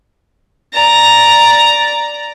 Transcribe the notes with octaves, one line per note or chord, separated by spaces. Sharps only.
D5 A#5